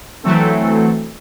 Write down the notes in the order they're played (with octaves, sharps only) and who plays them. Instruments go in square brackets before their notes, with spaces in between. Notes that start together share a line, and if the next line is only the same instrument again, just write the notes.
[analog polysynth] E3 F#3 A3 C4 A4